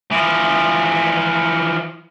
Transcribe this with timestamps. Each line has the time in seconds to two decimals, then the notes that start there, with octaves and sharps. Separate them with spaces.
0.11 E3 F3